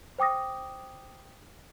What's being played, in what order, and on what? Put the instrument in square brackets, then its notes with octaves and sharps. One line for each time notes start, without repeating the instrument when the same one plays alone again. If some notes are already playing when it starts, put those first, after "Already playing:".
[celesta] C5 G5 D6 D#6 A#6